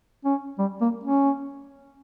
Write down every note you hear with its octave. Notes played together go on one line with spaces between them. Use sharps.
C#4
G3
A#3
C#4